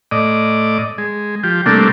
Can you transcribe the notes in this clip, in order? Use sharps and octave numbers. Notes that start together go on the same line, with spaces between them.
A2 D5 D#5
G#3
F3 G4
C3 G3 A3 A#3 D4